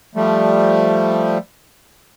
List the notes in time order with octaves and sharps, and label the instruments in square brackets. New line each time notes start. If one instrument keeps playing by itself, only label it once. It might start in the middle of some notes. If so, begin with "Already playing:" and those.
[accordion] F3 G3 A3